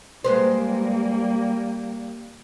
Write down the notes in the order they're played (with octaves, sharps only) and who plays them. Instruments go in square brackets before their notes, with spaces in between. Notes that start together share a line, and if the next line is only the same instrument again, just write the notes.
[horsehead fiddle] G3 A#3 [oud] G#3 B4 C5